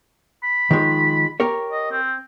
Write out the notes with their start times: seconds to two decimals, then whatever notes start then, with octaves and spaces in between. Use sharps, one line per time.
0.43 B5
0.71 D#3 F3 G#3
1.40 G4 A#4 C#5
1.72 D#5
1.92 C4